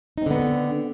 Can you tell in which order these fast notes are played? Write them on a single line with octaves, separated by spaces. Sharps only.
D#4 C4 D3 B3